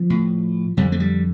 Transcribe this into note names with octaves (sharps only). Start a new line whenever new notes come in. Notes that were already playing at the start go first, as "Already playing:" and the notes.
Already playing: F3
A2
F2 D3 G3
A3
G3